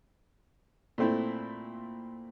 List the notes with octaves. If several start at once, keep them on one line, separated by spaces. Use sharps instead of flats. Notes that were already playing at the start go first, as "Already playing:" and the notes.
A#2 A3 C4 E4